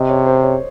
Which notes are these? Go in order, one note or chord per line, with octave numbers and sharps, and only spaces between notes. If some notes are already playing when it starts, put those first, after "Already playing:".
Already playing: C3 D#5
C#5
C5
C#5